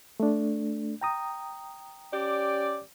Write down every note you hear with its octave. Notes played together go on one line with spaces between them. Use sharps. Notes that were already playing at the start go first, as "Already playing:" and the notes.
A3 D4
G5 A#5 D#6
C#4 G4 D5